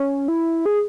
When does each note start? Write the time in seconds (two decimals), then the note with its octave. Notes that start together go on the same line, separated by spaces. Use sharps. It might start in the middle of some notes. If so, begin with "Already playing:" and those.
Already playing: C#4
0.28 E4
0.66 G#4